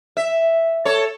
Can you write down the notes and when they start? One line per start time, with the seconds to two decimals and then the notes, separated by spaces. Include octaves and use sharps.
0.17 E5
0.85 A4 C#5